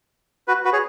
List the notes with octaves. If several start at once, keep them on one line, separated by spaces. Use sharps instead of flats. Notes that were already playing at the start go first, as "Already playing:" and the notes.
F#4 B4
F#4 B4
G#4 C#5